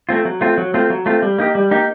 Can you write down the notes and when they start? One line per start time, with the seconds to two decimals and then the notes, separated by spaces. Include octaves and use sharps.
0.09 A3 C4 F4
0.25 F#3
0.41 A3 C4 F4
0.58 F#3
0.74 A3 C4 F4
0.90 F#3
1.06 A3 C4 F4
1.22 G3
1.38 A#3 D#4 G4
1.55 G3
1.71 A#3 D#4 G4